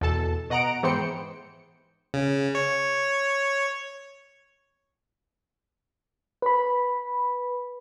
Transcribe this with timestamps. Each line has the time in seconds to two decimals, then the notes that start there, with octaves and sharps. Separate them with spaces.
0.01 E2 B2 A4 A5
0.50 B2 D#5 F#5 A#5 D7
0.83 G#2 E3 B3 C5 G5 C#7
2.14 C#3
2.55 C#5
6.42 B4 B5